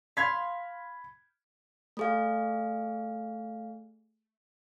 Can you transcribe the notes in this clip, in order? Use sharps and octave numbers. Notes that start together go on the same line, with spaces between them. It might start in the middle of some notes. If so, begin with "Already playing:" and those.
F5 B5 C6 F6 G#6 B6
A3 G#4 F5